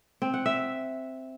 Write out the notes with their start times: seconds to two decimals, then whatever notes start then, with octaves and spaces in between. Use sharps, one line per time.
0.22 C4
0.34 F#5
0.46 E5